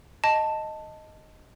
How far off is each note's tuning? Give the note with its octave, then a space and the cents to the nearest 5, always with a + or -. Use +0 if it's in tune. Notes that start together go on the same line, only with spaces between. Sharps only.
D#5 +0 A5 +5